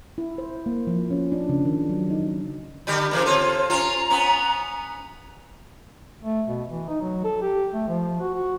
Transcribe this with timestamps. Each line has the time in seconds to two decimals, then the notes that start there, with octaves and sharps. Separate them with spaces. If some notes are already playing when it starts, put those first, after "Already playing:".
0.18 E4
0.38 C5
0.66 A#3
0.87 F3
1.10 C#4
1.32 D4
1.49 C#3
1.66 D#3
1.89 F#3
2.10 D#4
2.87 D3 G3 G4
3.11 C#3 E3 A#3
3.26 C4 F4 A4 C#5
3.70 C#4 F4 A#5
4.10 B3 C#4
6.23 A3
6.48 B2
6.70 E3
6.89 D#4
7.01 F#3
7.24 A4
7.42 G4
7.73 A3
7.88 F3
8.20 F#4
8.34 F#4